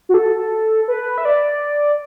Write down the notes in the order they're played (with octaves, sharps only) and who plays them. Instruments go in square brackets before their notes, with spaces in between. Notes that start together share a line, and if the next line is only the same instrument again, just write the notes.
[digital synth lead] F#4
A4
B4
E5
D5